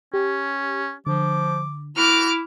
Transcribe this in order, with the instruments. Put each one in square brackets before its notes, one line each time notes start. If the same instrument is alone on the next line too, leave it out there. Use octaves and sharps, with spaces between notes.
[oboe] C#4 [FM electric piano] G4
[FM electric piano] D3 [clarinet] F3 [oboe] D6
[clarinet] E4 [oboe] F#4 [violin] D6 F6